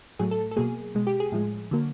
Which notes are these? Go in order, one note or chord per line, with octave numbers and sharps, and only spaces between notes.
A2 F#3 A3 G#4
A4
A4
B2 F#3 A#3 G#4
B2 G#3
G4
G#4
A2 F3 G#3
D3 F#3 A#3